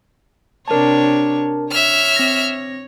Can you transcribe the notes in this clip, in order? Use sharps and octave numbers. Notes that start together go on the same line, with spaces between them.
C3 D4 A#4 C#5 A5
C#5 E5 F6
C4 A#6